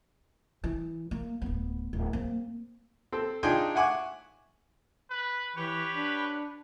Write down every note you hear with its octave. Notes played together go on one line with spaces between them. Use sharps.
E3
A#3
D1 B3
D1
A#3 C4
C4 A4
D4 D#4 F4 G#4 G5 G#5
E5 F#5 G#5 C#6 D6
B4
E3 G4 B4 C#5
D4